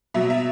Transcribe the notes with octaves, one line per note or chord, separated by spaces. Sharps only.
B2 F#3 E5
E5